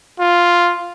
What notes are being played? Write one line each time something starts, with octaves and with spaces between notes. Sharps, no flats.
F4